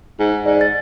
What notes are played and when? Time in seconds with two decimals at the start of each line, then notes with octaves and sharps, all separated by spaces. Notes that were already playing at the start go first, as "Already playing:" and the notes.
0.20 G#2
0.46 G#2 D5
0.61 A6